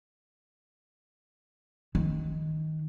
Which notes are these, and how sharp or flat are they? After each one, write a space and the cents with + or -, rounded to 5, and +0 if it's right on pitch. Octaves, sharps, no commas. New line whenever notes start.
D#3 +10